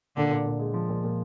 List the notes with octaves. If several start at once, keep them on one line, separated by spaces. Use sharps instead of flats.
A#2 D3
A#2
A#2
G#3
F3
A#2
A#2